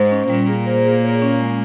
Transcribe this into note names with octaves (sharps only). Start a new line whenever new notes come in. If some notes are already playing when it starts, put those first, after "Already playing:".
Already playing: G#2 G#3 C5
C#4
A#2 G3 A#3
G#4
C5
G#4
C#5
C#4
G#3